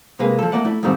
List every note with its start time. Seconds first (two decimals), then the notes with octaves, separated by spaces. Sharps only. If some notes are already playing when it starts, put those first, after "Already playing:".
0.19 C3 G#3 A#3 G#4 B4
0.39 F3 A4
0.52 A3 A#3 D5 F#5
0.65 A3 E4
0.83 F2 G#2 D#3 G3 C4